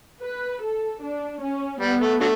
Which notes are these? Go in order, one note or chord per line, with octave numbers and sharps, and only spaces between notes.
B4
A4
D4
C#4
G3 B3
A3
D3 F#3 A3